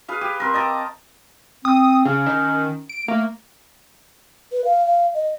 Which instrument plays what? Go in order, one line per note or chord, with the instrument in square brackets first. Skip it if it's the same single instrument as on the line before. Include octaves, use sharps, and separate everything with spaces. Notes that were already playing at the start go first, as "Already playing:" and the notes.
[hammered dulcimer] G#4 B4 F5
G4
C4 A#4
D#5 A5 A#5 D6
[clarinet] C4 [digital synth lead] D#6
[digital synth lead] C#3 [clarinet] C#4
[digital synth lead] D#3
D7
[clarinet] A3 [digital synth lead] A#3
[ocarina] B4
F5
F5
D#5